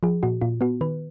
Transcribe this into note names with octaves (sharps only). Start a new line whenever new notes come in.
F3 G#4
A#2 F#4
A#2 F4
B3 F#4
D#3 B4